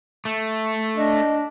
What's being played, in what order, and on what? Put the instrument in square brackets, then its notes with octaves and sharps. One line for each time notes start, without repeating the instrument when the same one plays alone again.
[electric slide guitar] A3
[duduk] D4 [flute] D#5